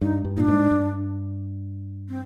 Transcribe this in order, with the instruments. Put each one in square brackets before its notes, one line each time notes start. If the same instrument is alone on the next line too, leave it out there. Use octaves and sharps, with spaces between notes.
[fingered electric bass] G2 [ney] D#4
[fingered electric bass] G2
[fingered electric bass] A#2 [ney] D4 D#4
[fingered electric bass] G#2
G2
[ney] C4